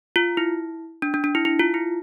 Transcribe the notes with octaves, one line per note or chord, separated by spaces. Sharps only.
F4
E4
D4
D4
D4
E4
E4
F4
E4